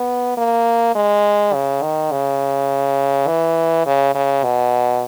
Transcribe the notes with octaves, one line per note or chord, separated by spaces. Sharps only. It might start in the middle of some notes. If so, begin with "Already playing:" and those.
Already playing: B3
A#3
G#3
C#3
D#3
C#3
E3
C#3
C#3
B2